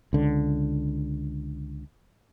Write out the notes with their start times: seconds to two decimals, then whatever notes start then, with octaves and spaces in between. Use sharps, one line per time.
0.13 C#2 D3